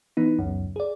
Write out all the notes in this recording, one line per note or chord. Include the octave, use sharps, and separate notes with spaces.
E3 B3 D#4
C#2 F#2
G#4 D5